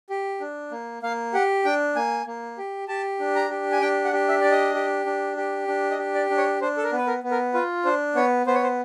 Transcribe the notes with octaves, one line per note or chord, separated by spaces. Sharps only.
G4
D4
A#3
A#3 F5
G4 F#5
D4 G5
A#3 G#5
A#3
G4
G4 A5
D4
A#5
G4
G#5
D4 G5
F#5
G4
E5
D4 D5
D#5
G4
D4
G4
D4
D#5
G4
D5
D4
C#5
D4 C5
A4
A#4
B3
B4
A#4
B3
A#4
F4 B4
D4 C5
B3 C#5
B3 C5
C#5
C5